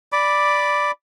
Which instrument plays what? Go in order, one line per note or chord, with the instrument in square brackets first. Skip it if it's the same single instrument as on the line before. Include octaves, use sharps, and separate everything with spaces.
[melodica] D5 B5 D6